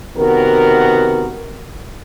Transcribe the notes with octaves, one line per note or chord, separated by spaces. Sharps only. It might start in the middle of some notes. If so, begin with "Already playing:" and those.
C3 D#3 B3 F#4 A#4